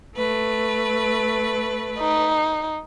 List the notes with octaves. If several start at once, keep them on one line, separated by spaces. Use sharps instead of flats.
A3 B4
D#4